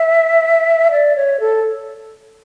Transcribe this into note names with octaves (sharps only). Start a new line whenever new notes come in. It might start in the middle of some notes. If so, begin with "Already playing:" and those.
Already playing: E5
D5
C#5
A4